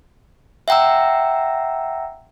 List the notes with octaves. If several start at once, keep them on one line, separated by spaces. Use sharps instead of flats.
E5 F#5 G5 A#5 E6